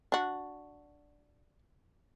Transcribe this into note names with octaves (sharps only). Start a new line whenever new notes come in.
D4 F#4